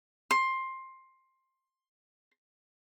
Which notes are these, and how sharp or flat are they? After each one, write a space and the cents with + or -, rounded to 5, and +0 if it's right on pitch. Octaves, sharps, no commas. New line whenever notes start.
C6 +15